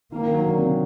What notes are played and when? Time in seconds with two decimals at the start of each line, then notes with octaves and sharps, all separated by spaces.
0.12 D#3 A#3
0.23 D#3
0.34 F#3
0.46 D3
0.57 C3